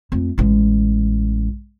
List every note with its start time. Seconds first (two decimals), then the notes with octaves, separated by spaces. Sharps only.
0.12 F2 A3
0.38 A1 G#3